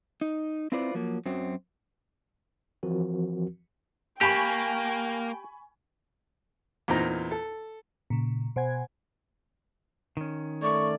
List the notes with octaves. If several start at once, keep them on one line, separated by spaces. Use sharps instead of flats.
D#4
C4 E4 F4 B4 C5 D5
F3 F#3 A#3
F#2 F#3 C4
E3 F3 C4 F#4 A#4
A#3 G4 G5 G#5 B5 C#6
E2 A#2 C4 D#4 A#5
A4
A#2 C#3
B2 C5 F#5 G#5 G#6
D#3 C#4
A3 D5 C#6